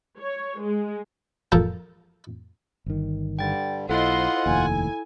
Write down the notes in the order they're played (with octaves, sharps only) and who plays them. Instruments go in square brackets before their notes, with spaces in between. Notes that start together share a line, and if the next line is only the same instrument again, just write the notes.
[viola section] C#5
G#3
[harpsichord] F3 A4 A#4
[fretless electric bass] G1 D#3
[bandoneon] G2 D3 G3 [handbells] G5 A6
[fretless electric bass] B1 [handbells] E4 A4 [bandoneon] F4 F#5 [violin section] C5 D#5 C6
[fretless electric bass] F1 D#2 [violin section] G#5